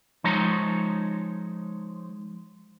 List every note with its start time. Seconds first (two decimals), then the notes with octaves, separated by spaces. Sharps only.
0.24 F3 G#3 D#4 C#5 A#5